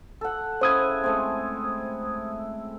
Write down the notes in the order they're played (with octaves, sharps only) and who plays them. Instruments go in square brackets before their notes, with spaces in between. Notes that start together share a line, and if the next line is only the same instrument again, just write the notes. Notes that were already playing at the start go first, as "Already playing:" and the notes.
[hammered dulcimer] A4 F#5
[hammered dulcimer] C#3 E4 [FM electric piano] C5 D#6 G#6
[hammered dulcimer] G#3 A3 C4